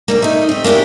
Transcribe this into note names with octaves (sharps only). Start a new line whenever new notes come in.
D2 G3 A#3
A3 D#4
C4 G4
A#3 C#4 D4 E4 G4